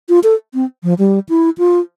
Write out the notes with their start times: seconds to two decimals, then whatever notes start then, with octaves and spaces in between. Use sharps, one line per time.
0.09 F4
0.24 A4
0.54 C4
0.83 F3
0.98 G3
1.29 E4
1.58 F4